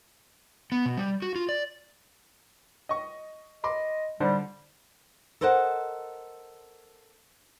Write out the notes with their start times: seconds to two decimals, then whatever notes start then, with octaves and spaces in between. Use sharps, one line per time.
0.72 B3
0.85 B2
0.97 G3
1.22 F#4
1.36 F4
1.49 D5
2.89 D#5 C#6
3.64 D#5 B5 C6 D6
4.20 D3 G3 C5 D5
5.41 A4 A#4 C5 D#5 F#5